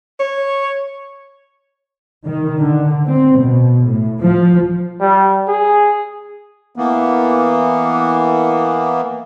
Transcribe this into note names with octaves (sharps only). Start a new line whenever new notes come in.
C#5
D#3
D3
C4
B2
A2
F3
G3
G#4
E3 A#3 B3